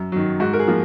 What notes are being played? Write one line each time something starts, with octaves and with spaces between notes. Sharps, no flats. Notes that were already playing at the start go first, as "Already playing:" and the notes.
Already playing: F#2
D#3 F#3
G#2 F#4
A#4
G#4
F3 A#3